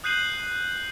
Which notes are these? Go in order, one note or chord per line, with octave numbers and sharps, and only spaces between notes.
D#6 F#6 G6 C7 D#7 F#7